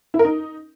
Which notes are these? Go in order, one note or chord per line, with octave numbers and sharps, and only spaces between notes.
E4
A#4
D#4